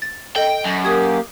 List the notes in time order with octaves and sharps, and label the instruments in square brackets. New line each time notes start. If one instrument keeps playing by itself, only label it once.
[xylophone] A6
[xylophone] A4 D#5 [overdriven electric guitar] G5
[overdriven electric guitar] F#2
[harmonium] A#3 G4 [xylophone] D#6 G#6